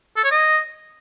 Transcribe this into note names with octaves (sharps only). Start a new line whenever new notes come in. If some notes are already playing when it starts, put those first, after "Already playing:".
A4
C#5
D#5